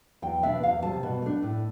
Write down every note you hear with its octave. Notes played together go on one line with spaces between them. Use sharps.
E2 G5
B2 B3 D4 E5
E2 F5
C3 G3 A5
B2
A3 D4
A2